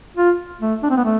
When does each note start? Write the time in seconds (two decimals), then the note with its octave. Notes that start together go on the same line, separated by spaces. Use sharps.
0.17 F4
0.61 A3
0.83 D4
0.90 C4
0.97 B3
1.04 A3